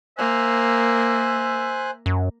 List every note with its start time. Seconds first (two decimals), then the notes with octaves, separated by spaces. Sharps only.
0.18 A#3 C5 E5 G#5 F#6
2.06 F#2